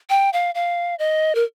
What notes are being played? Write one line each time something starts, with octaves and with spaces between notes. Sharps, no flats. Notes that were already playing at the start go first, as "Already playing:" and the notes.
G5
F5
F5
D#5
A#4